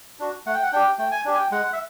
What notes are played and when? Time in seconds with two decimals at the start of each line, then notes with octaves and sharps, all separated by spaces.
0.19 D4 F#4
0.46 A3 F#5
0.54 G5
0.63 F#5
0.72 D4 G4 G5
0.98 A3 G5
1.11 G#5
1.25 D4 G4
1.34 G#5
1.38 G5
1.51 G#3 F#5
1.73 E5